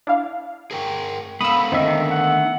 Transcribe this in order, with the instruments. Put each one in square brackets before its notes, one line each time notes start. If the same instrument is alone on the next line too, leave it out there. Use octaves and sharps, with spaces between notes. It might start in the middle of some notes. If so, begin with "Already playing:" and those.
[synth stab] D4 E4 F5
[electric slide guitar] G#4 A#4 G5
[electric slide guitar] A3 B3 F5 [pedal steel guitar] B5 [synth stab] D#6 E6
[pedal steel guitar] D3 D#3 E5 [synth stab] C4 [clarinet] D#5
[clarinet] F#5